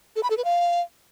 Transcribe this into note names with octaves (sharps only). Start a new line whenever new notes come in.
A4
B5
A4
B4
F5